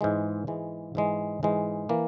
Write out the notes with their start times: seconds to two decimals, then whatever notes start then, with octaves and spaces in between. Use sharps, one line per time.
0.01 G#2 E3 G#3
0.47 G#2 E3 G#3
0.95 G#2 E3 G#3
1.43 G#2 E3 G#3
1.89 E3 A#3